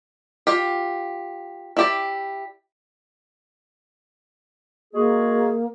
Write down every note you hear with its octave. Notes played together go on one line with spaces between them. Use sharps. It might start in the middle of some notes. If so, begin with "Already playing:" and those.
F4 G4
E4 G4 D5
G#3 A#3 F#4 G#4